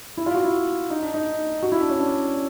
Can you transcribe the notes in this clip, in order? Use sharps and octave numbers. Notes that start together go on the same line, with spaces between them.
E4
F4
F#4
E4
D#4
D4
D#4
F#4
E4
D4
C#4
D4